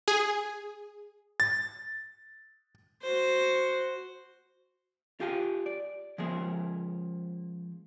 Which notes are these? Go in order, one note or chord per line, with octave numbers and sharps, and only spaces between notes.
G#4
A6
F#4 C5
F4 G4 G#4 F5 G#5
D5
F3 G#3 A#3 C#4 G#4 E5